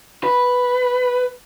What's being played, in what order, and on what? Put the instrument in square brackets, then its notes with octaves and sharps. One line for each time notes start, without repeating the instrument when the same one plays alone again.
[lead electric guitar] B4